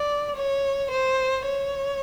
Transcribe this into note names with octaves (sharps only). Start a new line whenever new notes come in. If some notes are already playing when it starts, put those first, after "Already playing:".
Already playing: D5
C#5
C5
C#5